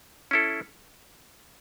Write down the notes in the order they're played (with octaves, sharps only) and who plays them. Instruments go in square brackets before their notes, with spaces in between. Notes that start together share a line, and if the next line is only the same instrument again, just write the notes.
[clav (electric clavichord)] C#4 E4 A4